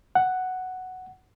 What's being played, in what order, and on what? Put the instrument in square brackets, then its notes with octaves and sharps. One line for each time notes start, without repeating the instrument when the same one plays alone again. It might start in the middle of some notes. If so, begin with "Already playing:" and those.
[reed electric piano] F#5